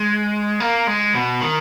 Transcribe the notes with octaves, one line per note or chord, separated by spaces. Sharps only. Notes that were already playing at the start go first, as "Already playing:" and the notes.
Already playing: G#3
A#3
G#3
B2
D#3